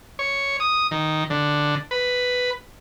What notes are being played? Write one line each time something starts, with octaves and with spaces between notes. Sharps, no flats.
C#5
D#6
D#3
D3
B4